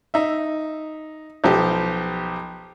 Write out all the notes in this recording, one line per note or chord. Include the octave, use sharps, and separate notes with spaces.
D#4 E5
B1 F3 G4